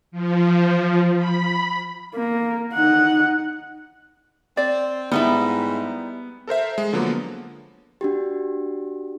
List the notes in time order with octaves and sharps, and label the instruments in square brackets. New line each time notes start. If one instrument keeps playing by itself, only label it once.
[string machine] F3
B5
[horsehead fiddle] A#3
D#4 F#5
[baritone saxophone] C4 [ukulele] D5
[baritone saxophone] G#2 [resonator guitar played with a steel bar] G3 D#4 E4 [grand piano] B3
[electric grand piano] A4 A#4 C5 E5
G#3
D3 F3 F#3 A#3 B3
[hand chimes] D4 F#4 G4